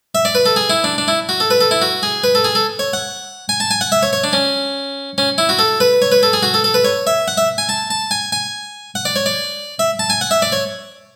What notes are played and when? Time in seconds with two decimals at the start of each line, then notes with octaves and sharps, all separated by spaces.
0.15 E5
0.25 D5
0.35 B4
0.46 A4
0.56 G#4
0.70 E4
0.84 D4
0.98 D4
1.08 E4
1.29 F#4
1.40 A4
1.51 B4
1.61 A4
1.71 E4
1.82 F#4
2.03 G#4
2.24 B4
2.35 A4
2.44 G#4
2.55 A4
2.79 C#5
2.93 F#5
3.49 G#5
3.60 A5
3.71 G#5
3.81 F#5
3.92 E5
4.03 C#5
4.13 C#5
4.24 D4
4.33 C#4
5.18 C#4
5.38 E4
5.49 F#4
5.59 A4
5.80 B4
6.02 C#5
6.12 B4
6.23 A4
6.33 G#4
6.43 F#4
6.54 A4
6.64 A4
6.74 B4
6.85 C#5
7.07 E5
7.28 F#5
7.37 E5
7.58 G#5
7.69 A5
7.90 A5
8.11 G#5
8.32 G#5
8.95 F#5
9.05 D5
9.16 C#5
9.26 D5
9.79 E5
9.99 A5
10.10 G#5
10.21 F#5
10.31 E5
10.42 D5
10.52 C#5